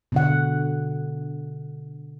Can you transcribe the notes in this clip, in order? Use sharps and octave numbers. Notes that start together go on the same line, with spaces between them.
B2 D3 F#5